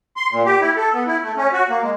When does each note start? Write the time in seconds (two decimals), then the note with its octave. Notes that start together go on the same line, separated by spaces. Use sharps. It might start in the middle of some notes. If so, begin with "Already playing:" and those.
0.17 C6
0.32 A#2
0.46 G4
0.61 E4
0.76 A4
0.94 B3
1.07 E4
1.22 A3
1.37 C#4
1.53 F#4
1.69 A#3
1.83 G#3